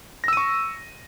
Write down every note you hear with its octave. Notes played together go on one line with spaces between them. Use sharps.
C#6 E6 A#6 D#7